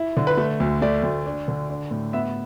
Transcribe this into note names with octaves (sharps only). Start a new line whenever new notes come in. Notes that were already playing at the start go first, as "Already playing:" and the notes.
Already playing: E4
D3
B4
A3
D2
A3 D5
D2
D4
D3
D4
A2
B3 E5